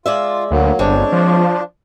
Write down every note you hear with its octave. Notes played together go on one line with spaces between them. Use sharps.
G#3 F4 D5 E5
D2 F#3 A#3
G1 G#3 C4 D4 C#5
F3